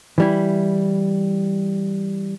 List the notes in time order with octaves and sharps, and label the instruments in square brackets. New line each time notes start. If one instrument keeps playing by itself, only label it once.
[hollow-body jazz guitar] E3 G3 E4